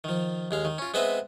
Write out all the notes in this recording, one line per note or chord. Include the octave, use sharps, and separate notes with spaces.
D#3 F3
D#2 G#3 F5
D#3
C#4 F4
G#3 B3 C4 B4 D#5 E5